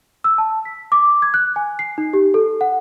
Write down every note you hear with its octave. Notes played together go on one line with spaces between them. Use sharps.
E6
A5
B6
D6
G#6
F#6
G#5
C7
D#4
G4
A4
F#5